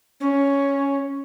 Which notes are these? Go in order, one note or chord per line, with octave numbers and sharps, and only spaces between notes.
C#4